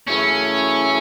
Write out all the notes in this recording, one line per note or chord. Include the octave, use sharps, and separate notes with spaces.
F#2 C#3 E3 A3 C#4 E4